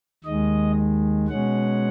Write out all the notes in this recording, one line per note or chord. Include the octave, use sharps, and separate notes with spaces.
D#2 D#3 G#3 D#5
B2 G#3 C#4 F#5